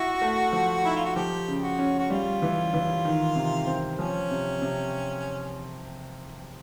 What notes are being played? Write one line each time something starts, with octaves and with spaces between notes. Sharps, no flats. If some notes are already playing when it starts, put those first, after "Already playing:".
Already playing: E4 F#4
A3
F3
D#4 E4
F4
F#4
F3 G4
C#3
F#4
C#4
F#4
G3 F4
E3
E3
D#3
C3
C4
F3 C#4
C3
C3